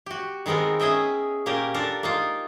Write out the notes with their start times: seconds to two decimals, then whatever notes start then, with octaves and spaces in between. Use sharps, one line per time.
0.06 F#4 G4
0.46 D#3 G#3 B3 C4 A#4
0.79 C#4 G#4 D#5 E5 G5
1.46 A#2 A#3 C#4 G4 A#4
1.74 D4 F4 A4 A#4
2.03 A#3 D#4 F4